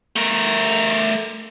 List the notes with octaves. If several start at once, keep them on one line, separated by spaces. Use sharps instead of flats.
A3 A#4